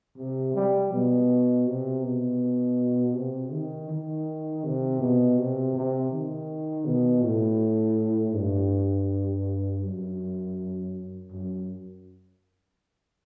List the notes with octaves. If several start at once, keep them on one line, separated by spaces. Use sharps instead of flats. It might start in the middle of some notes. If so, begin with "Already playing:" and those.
C3
G3
B2
C3
B2
C3
D#3
D#3
C3
B2
C3
C3
D#3
B2
A2
G2
F#2
F#2